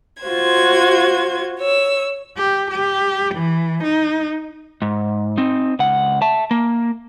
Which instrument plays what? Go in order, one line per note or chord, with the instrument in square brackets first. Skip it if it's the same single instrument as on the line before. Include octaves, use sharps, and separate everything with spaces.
[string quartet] F4 F#4 C5 G#6
C#5 E6
[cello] G4
G4
E3
D#4
[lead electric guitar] G#2
C4 D#4
C#2 F#5
E5 A5
A#3